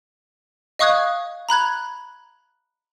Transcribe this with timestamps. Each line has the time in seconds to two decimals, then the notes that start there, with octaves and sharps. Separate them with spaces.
0.79 D#5 F5 C#6 D#6 F#6 G#6
1.49 A#5 B5 F#6 G#6